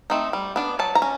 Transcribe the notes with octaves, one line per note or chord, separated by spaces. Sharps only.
A3 C4 D#4
G3
B3 D4
F#3 A5
A#5
C#4